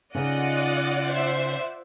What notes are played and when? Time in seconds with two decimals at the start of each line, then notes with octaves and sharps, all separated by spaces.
0.15 C#3 D#4 F4 D5 D#5 F#5
1.05 C5 E5